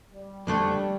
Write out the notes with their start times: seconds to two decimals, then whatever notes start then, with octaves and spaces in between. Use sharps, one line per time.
0.12 G3
0.47 F2 D3 G3 A3